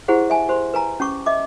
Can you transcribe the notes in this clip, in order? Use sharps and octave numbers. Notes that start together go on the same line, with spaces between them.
E4 G4 G#4 C5 F#5
E5 G#5 A5
G4 C5 C6
B4 G#5 A#5
C#4 G4 C#6 D6
D#5 E5 D6